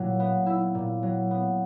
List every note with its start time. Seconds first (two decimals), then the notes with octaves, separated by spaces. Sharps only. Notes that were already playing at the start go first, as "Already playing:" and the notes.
Already playing: A#2 F#3 E4
0.20 B3
0.46 E4
0.75 A#2
1.03 F#3
1.31 B3